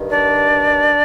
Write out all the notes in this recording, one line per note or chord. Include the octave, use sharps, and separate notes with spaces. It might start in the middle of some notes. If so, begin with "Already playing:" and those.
Already playing: G2 D#3
D4 D5